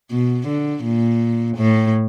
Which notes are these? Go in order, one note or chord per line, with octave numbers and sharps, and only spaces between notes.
B2
D3
A#2
A2